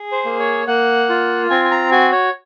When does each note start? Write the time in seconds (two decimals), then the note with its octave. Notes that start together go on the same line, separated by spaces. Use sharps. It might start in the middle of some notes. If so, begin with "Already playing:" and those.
Already playing: G#4
0.12 C5
0.25 A#3
0.40 C#5
0.67 A#3 F#5
1.09 F4
1.50 C4 G#5
1.65 G#5
1.71 A#5
1.91 F#4 G#5
2.12 C#5